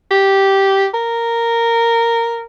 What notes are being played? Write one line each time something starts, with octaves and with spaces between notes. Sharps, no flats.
G4
A#4